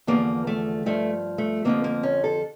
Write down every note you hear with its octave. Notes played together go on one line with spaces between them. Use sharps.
E2 D3 F3 A#3
A3
G2 F3 A3
A3
F2 D3 F3 A#3
A#3
C#4
A4